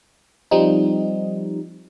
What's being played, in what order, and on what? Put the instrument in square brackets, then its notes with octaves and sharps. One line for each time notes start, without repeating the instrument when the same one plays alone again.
[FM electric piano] F3 G3 C4 D#4